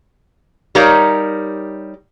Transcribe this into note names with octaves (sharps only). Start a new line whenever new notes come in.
G3 D#4 G4 A#4 C#5 F5